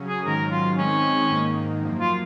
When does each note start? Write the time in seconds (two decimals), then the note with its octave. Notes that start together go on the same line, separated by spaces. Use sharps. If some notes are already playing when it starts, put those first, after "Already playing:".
Already playing: C#3 F#3 C#4
0.08 G#4
0.25 G#2 D#3 F#3 C#4 A#4
0.52 F4
0.78 D#3 G#3 C4 C#4 D#4
1.30 G#2 D#3 A#3 D#4
1.82 F#2 F3 A#3
2.00 F4